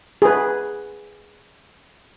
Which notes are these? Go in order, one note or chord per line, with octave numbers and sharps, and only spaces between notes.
G#4 B4